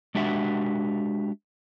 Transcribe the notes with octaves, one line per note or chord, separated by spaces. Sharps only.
G#3 D4 F#4 G4 E5 F#5